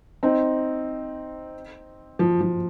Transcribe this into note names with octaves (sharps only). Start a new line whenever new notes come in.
C4 D#4
F3
F3